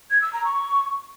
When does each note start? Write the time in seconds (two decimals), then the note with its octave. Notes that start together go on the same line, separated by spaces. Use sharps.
0.11 G#6
0.22 E6
0.33 A#5
0.44 C#6